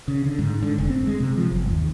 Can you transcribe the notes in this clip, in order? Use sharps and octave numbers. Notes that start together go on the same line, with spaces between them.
C#3
D3
G#2
D3
F1
C4
G#3
C3
F3
G1
D#2